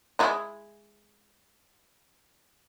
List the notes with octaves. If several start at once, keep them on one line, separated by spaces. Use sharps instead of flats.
G#3 E4 D#5